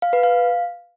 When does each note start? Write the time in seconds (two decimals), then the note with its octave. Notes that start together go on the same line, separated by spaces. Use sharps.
0.02 F5
0.13 B4
0.24 F5